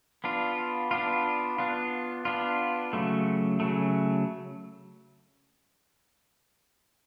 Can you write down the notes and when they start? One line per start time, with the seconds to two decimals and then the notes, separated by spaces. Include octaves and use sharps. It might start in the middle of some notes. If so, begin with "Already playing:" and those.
0.24 B3 D4 F4
0.91 B3 D4 F4
1.58 B3 D4 F4
2.25 B3 D4 F4
2.93 C#3 F#3 A3
3.60 C#3 F#3 A3